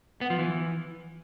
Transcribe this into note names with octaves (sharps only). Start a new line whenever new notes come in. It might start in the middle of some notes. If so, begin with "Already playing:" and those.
B3
F3
E3